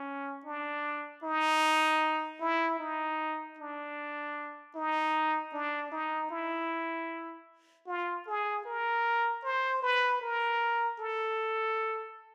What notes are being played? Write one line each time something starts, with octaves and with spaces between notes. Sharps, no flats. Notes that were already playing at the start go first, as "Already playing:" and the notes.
Already playing: C#4
D4
D#4
E4
D#4
D4
D#4
D4
D#4
E4
F4
G#4
A#4
C5
B4
A#4
A4